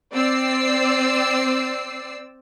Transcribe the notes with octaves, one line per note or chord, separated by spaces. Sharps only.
C4 D5 E6 C7